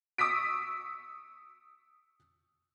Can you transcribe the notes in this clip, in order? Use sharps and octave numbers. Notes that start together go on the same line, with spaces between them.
C#6 D#6 E6 B6 D7